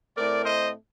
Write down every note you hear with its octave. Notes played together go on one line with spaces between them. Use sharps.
A2 A3 C4 A#4 D5
C5 D#5